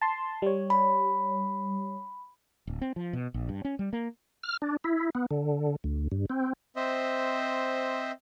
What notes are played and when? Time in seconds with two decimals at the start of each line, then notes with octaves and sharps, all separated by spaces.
0.01 A5 C6
0.42 G3 C#5
0.70 B5
2.67 D1
2.81 C4
2.96 F3
3.13 B2
3.34 A#1
3.49 G2
3.65 C#4
3.79 G3
3.93 A#3
4.43 F6
4.62 D4
4.84 E4
5.15 B3
5.31 D3
5.84 D2
6.12 G2
6.30 C4
6.76 C4 C5 D#5 E5